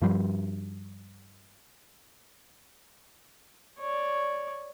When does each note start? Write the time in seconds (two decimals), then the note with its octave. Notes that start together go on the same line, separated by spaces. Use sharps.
0.02 G2 F3 G3
3.79 C#5 D5